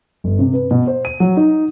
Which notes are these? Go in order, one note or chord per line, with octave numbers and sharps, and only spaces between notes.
G1
C3
B4
B2
C5
D#7
F#3
D#4